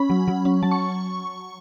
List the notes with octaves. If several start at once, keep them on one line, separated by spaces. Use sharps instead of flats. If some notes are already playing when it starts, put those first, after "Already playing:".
Already playing: C#4 B5
F#3
F#3
C#4
F#3 A5
C#6